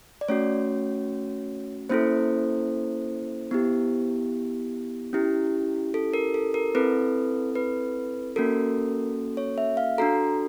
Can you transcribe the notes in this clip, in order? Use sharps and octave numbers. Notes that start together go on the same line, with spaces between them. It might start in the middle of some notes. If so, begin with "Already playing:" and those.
D5
A3 C#4 F#4 C#5
A#3 C#4 E4 A4 C5
B3 E4 G4
C#4 E4 G4
A4
A#4
A4
A#4
C4 E4 A4 B4
B4
A#3 C#4 F#4 A4 A#4
C#5
E5
F5
D4 F#4 A4 A#5